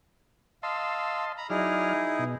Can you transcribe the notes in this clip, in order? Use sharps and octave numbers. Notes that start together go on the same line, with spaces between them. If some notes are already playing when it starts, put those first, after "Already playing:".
D#5 F5 A5 C6 E6
A#5 B5
F#3 D#4 E4 G#4 D5 F6
B2